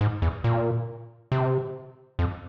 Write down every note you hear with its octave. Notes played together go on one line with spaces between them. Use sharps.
G#2
E2
A#2
C3
F2